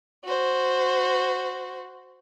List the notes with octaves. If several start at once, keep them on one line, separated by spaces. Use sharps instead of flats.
F#4 C5